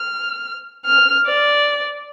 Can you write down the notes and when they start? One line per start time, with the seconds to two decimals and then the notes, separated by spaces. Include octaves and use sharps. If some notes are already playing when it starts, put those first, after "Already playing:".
Already playing: F6
0.86 F6
1.27 D5